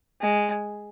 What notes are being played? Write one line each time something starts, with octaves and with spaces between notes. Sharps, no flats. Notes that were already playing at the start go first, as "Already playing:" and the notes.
G#3